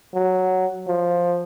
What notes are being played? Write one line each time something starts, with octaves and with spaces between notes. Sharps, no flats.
F#3
F3